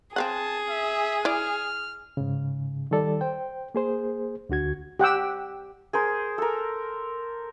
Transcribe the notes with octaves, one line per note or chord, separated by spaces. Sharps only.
C4 G#4 F5 F#5 A5
E5
E4 D5 F6
G#2 C#3
D#3 G3 A4 D5
C5 G5
A#3 G#4 C5
D2 D3 F#4 G#6
G4 F#5 G5 E6
G#4 A#4 C5
A4 A#4